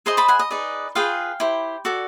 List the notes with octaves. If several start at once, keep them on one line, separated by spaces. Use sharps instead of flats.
G#4 C5 D#5 A#5 C6
A5 B5
F#5 G#5
D#5
D#4 G#4 B4 D5
F4 G#4 B4 F5 G5
E4 G4 C5
F#4 A4 D5